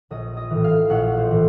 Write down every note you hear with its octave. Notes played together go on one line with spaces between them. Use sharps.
A#1 D#5
D#5
A2 E3
F5
A#1 F#5
C5
A2 E3